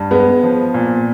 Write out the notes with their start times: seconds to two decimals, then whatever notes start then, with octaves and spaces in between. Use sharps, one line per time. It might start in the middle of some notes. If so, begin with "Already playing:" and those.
Already playing: G2
0.11 G#3 B3
0.44 F3
0.74 A#2